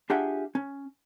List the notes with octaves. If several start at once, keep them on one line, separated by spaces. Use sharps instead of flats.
D4 F4 G4 G#4 E5 F#5
C#4